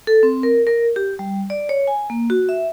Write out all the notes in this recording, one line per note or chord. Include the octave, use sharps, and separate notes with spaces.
A4
C4
A#4
A#4
G4
G3
D5
C#5
G#5
A#3
F#4
E5